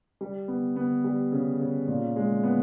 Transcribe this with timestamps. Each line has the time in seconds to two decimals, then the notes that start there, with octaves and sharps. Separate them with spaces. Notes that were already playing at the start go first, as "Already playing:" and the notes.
0.21 G3
0.48 B3
0.76 B3
1.04 G3
1.32 C#3
1.60 C#3
1.88 A#2
2.16 G#3
2.43 B3